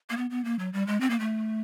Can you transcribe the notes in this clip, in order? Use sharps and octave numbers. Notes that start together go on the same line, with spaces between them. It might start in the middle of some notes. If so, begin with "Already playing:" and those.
A#3
B3
B3
A#3
F#3
G3
G#3
C4
A#3
A3